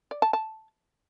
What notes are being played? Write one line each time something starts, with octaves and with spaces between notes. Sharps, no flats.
D5
A5
A5